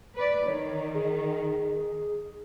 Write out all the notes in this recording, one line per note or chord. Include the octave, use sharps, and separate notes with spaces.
B4 D5
D#3 C#5
G#4